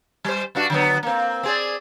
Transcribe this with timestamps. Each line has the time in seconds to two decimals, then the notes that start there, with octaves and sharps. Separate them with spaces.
0.24 G3 C5
0.55 G2 D4 F#4
0.70 D3 F#3 B3
1.03 A#3 C4
1.43 C4 G#4 D5